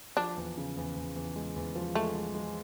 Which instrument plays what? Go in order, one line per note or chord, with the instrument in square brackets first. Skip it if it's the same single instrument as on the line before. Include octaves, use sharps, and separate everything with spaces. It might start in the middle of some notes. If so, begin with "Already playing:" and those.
[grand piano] F3 [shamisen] D4
[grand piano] E2
C#3
E2
E2
E2
G#3
E2
F3
[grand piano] G#3 [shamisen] A3
[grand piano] G#3
G#3